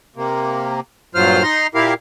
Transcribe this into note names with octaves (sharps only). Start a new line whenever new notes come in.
C3 A#3
G2 A#2 F#3 F4 C5 F6
D#4 A#5 C6
A#2 E4 G4 A#4 F5